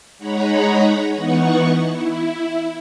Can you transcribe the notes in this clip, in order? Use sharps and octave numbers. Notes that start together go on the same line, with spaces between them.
G#3 D#4 C#5 F#5 A#5 B5
E3 B3 D#4 F#5 C#6
E4